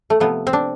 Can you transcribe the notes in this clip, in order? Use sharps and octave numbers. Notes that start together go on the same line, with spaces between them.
A3
C3 F3 A3 B3
C4
D4